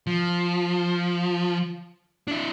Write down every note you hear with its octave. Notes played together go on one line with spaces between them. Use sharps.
F3
D4 E4